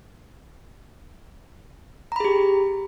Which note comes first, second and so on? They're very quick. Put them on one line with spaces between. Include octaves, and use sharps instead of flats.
A#5 B5 G#4 G4